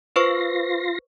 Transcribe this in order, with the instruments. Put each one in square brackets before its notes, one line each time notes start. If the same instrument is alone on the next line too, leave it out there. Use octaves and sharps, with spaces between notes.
[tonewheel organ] F4 C6 A#6 [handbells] B4 C5 C#6